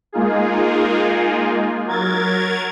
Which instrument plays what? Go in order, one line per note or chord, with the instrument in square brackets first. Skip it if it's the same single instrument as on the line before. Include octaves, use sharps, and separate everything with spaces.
[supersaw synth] G#3 A#3 D#4 F4 G#4
F#3 A#4 G#6 A6